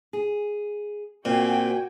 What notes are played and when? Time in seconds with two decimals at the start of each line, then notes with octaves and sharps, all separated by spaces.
0.13 G#4
1.25 A#2 C4 F#4 G5 G#5